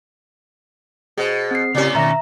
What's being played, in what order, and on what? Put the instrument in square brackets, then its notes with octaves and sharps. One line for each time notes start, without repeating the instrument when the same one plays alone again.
[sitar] B2 [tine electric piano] G#4 C5
[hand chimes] C4 C7
[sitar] A2 C#4 [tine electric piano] C#3 G4
[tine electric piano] B2 D#3 A#6 [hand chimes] E5 A#5